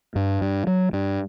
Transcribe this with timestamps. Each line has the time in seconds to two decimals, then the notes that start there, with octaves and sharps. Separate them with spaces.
0.16 G2
0.41 G2
0.67 F#3
0.93 G2